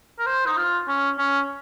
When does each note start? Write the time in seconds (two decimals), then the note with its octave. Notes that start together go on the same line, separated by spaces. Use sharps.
0.19 A#4
0.26 C5
0.47 D#4
0.57 F4
0.88 C#4
1.19 C#4